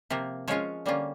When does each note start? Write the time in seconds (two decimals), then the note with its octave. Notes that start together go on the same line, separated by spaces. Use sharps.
0.10 C3 F3 A#3
0.48 F3 G#3 C#4 F4 C#5
0.86 D3 G3 A#3 C#4 F4